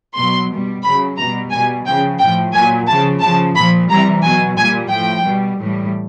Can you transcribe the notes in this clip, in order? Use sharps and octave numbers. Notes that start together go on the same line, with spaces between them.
B2 F#3 C6
B2 G3
C#3 F#3 B5
B2 G3 A#5
B2 G3 G#5
C#3 F3 G5
A2 F3 G5
A#2 F#3 G#5
C#3 F3 A5
C#3 F3 A5
A#2 F3 B5
C3 E3 G3 A#5
B2 F#3 G#5
A#2 G3 G#5
A2 F3 G5
B2 G3
A2 E3 G3